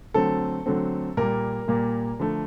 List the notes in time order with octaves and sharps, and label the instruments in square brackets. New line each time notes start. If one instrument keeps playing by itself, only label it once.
[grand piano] D3 F#3 A3 C4 A4
D3 F#3 A3 C4
A#2 G3 A#3 A#4
A#2 G3 A#3
D3 F3 A3